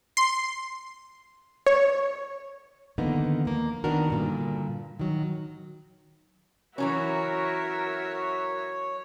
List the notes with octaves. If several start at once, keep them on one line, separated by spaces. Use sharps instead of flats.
C6
C#5
D3 D#3 F3 A#3 B3 D#4
D#2 A#3
D#3 B3 D4 F#4 A#4
G2 A#2 D3
D#3 F#3
E3 F#3 C#4 F#4 A#4 C#5 E5